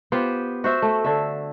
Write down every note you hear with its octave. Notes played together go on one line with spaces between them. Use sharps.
B3 F4 G4 C5
F#4 C5 E5
A3
D3 E5